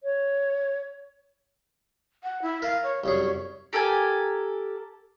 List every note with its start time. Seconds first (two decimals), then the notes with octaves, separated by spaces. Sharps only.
0.03 C#5
2.23 F#5
2.42 E4
2.62 A#4 F5
2.83 C#5
3.04 C2 F#2 G#4 C#5
3.73 G4 A4 A#4 G#5